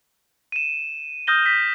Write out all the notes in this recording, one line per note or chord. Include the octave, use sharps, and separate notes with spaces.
D#7 E7
D#6 F6 G6 A#6 G7
B6